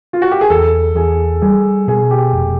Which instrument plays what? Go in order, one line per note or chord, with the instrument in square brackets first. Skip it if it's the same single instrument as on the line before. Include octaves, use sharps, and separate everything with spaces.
[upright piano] F4
F#4
G4
G#4
[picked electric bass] E2 [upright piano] A4
[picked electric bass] E2 [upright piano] G#4
[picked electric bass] G3 [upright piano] G#4
[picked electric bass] B2 [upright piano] G#4
[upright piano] G4
[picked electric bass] F1